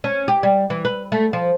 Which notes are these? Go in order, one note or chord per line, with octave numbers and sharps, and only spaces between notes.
C#4
G4
G3
E3
B4
A3
F3